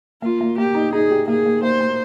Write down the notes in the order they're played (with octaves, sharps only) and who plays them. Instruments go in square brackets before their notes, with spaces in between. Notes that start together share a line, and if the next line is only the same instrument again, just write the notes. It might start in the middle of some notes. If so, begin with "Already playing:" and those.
[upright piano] A#3 [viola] F4
[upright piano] A#3
[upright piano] A#3 [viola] G4
[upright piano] D#4
[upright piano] D#4 [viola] G#4
[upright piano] G4
[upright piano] A#3 [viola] G#4
[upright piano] A#3
[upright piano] A#3 [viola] C5
[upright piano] A#3